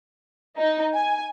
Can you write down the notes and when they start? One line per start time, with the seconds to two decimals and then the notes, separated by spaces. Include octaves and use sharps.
0.58 D#4
0.94 G#5